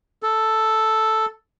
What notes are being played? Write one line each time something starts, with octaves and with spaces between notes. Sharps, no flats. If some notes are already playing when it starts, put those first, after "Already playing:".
A4